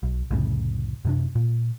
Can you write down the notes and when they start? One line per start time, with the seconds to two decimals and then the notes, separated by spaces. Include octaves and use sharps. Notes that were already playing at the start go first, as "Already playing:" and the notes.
0.03 B1
0.31 C2 F2 A2 C#3
1.05 F#2 C3 D4
1.35 A#2